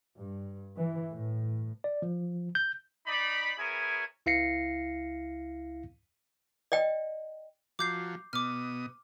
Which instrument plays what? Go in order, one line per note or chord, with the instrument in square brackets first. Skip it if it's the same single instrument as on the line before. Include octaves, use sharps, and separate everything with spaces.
[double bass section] G2
E3
A2
[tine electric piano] D5
F3
G6
[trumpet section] D#4 D5 B5
B3 E4 G#4 A#4 C#5 G#5
[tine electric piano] C#2 E4 F5 A#6 C7 C#7
[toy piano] D5 D#5 G5
[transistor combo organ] F3 F#3 [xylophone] D6 G6 C7
[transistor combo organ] B2 D#6 [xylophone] D6 F6